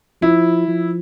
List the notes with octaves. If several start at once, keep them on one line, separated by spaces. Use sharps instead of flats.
F3 E4
F3